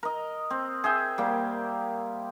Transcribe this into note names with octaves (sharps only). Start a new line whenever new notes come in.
A#4 D#5
C4
G#4 E5 G5
G3 A#3